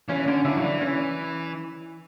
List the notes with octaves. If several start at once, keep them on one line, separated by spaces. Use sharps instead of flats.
E3 C#4
D3 C#4
D3 E4
F#3
E3 D4
C#4